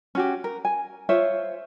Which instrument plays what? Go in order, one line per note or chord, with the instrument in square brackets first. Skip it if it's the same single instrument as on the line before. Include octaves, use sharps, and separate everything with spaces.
[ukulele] C#4 F#4 G4
A#4
G#5
F4 C5 C#5 E5